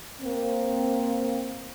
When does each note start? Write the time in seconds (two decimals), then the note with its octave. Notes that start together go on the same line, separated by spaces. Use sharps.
0.22 A#3 C4